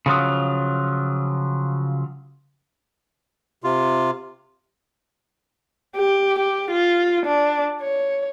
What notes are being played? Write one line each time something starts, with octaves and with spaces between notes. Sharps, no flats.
C#3 F3 F#3
C3 F4
G4
G4
F4
D4
C#5